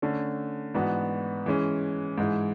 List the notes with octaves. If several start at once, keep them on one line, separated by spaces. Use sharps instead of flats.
D3 A3 C#4
G#2 E3 B3 D4 F#4
E3 G#3 C#4
G#2 E3 G#3